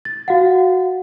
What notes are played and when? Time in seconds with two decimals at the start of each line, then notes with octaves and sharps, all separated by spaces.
0.05 A6
0.28 F#4 F5 F#5